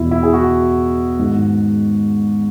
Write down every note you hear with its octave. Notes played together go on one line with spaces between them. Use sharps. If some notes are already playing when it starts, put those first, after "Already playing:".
Already playing: E2 B2 E4
E4
G#4
F#4
G#2 D#3